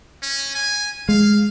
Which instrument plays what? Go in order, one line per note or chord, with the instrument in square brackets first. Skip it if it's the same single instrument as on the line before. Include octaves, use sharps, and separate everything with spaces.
[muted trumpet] C#4
G#5
[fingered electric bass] G#3 [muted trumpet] F5